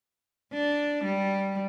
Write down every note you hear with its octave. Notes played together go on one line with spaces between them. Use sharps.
D4
G3